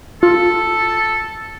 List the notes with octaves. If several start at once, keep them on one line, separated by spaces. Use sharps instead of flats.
F4 A4